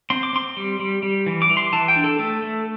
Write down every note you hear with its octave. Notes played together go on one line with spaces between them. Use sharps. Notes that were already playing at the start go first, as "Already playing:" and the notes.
C4 C6
D6
C4 C6
G3
G3
G3
E3
D6
E3
C6
E3 A5
G5
D4
A4
A3 A4
A3